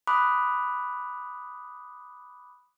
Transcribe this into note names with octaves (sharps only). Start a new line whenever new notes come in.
B5 D6 D#6 F#6